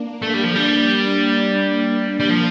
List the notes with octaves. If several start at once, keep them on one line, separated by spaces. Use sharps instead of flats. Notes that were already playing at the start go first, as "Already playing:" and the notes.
Already playing: A#3 D4
A3
G3
F3
G3
G3
F3